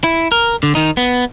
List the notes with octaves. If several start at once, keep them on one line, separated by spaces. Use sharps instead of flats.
E4
A#4
D3
D#3 D#4
B3